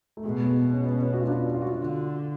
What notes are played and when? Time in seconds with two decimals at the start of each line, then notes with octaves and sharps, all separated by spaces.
0.17 A3
0.25 B2 G#3
0.44 B3
0.73 C#4
0.84 B3
1.02 C#4
1.13 F#4
1.21 F4
1.28 D4
1.54 F4
1.62 F#4
1.69 F4
1.79 D3